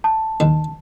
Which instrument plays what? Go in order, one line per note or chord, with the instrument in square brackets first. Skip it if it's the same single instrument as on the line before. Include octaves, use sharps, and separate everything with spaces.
[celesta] A5
[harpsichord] D#2 D#3